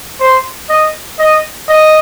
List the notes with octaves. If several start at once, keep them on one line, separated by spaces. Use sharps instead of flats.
C5
D#5
D#5
D#5